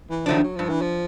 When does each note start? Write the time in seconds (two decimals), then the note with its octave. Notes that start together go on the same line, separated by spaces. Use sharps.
0.10 E3
0.26 D#3 F3 F#3 A3 D4
0.43 F#3
0.56 G2 F3
0.69 E3
0.81 F3